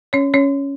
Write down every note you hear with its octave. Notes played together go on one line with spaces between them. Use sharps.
C#4 C#5
C#4 C#5